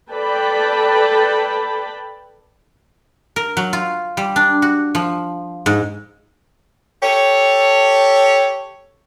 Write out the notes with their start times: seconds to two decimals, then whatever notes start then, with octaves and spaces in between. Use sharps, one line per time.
0.10 A4 B4 D5 G5 A5 B5
3.36 A#4
3.57 F#3
3.73 F4
4.17 G3
4.36 D4
4.62 F#4
4.95 F3
5.66 G#2
7.03 G4 A4 C#5